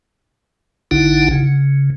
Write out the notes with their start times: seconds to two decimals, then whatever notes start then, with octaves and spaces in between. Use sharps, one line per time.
0.91 A1 D3 D#4 E4 F#5
1.31 C#3